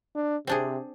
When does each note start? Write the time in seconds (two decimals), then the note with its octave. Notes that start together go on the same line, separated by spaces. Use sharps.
0.16 D4
0.47 C3 C4 D4 G#4